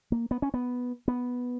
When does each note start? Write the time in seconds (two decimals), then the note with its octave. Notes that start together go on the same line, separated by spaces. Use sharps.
0.12 A#3
0.31 B3
0.42 C#4
0.54 B3
1.08 B3